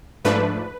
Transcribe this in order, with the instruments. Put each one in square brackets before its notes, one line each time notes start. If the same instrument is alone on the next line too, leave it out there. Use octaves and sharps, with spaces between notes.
[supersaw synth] G#2 F3 A3 D4 B4